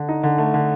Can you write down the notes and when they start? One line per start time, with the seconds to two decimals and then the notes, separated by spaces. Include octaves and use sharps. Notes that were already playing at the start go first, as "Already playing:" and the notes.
Already playing: D3
0.09 D#4
0.23 D3
0.38 A3
0.54 D3